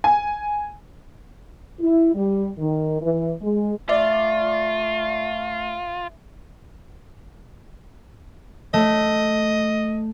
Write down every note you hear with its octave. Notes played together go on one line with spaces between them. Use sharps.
G#5
E4
G3
D#3
E3
G#3
A3 F4 D5 E5
A3 D#5